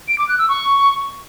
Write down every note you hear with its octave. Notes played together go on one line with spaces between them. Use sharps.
D7
D6
F#6
E6
C#6